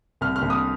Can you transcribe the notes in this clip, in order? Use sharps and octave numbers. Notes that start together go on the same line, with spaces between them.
C2 F6
F6
C2
D#6